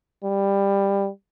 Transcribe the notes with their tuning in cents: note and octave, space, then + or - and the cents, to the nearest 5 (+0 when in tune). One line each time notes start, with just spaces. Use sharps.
G3 +15